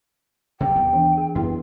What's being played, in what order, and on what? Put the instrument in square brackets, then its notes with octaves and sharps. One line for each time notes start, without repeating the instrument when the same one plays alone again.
[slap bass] C3 F#3 [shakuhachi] G5
[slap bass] D#2 B3
[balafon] E3 D4
G#4
[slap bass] F#2 [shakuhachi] B3 [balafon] E4